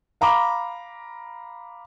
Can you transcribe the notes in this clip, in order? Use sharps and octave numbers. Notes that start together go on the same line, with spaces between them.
F5 A#5 B5 D6